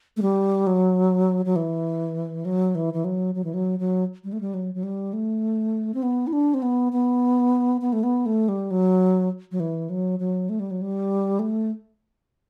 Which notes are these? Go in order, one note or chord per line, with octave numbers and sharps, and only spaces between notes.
A3
G3
F#3
F#3
E3
F#3
E3
E3
F#3
F#3
E3
F#3
F#3
G3
A3
G3
F#3
F#3
G3
A3
C4
B3
E4
D4
C4
B3
B3
B3
A3
B3
A3
G3
F#3
F#3
E3
F#3
F#3
A3
G3
F#3
G3
A3